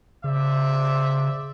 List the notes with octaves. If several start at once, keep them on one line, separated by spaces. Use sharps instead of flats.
C#3 C5 D5 E5